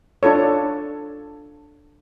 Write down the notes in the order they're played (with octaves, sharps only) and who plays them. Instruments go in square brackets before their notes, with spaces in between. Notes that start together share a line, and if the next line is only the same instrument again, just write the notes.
[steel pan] D4 F4 A4 C#5